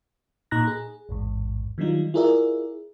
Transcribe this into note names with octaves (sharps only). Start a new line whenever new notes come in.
A#2 D#4 A#5 F#6 A#6
G#4
A1 E2 G#2
D#3 F#3 G3 D4 D#4 F4
E4 F4 G#4 A#4 D5 E5